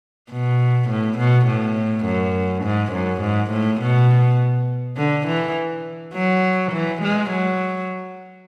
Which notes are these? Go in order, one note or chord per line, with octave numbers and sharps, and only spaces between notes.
B2
A2
B2
A2
F#2
G#2
F#2
G#2
A2
B2
D3
E3
F#3
E3
G#3
F#3